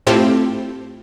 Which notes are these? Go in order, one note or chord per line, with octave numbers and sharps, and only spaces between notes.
A2 C4 E4 F4 G4 A4